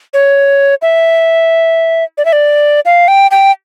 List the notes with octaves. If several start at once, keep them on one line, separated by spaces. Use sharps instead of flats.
C#5
E5
D5
E5
D5
F5
G5
G5